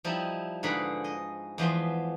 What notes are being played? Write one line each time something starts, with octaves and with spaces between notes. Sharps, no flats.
F3 G3 D#4 E4
G#2 D3 G#4 B4 B5
D#5
E2 F3 B3 C6